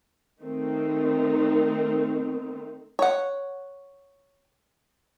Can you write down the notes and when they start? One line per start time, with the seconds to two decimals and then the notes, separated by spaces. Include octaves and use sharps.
0.40 D#3 A3 C4 D#4
2.99 C#5 F#5